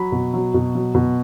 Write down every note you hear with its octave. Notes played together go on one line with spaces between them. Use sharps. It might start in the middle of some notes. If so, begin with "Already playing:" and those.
Already playing: F#3 B5
B2
F#3
B2
F#3
B2